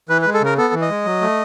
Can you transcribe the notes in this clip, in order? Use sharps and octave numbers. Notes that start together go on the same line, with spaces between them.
E3 B4
B4
G#3
A4
C#3 A#4
B3 A4
E3
D#5
G#3
F#3
A3